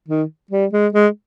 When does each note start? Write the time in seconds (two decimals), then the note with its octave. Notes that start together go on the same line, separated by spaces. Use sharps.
0.08 D#3
0.51 G3
0.73 G#3
0.93 G#3